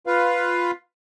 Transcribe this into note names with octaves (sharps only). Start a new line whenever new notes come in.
F4 B4 F5